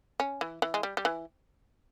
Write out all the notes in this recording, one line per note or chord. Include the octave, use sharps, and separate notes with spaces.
C#4
E3
E3
G#3
G3
G3
E3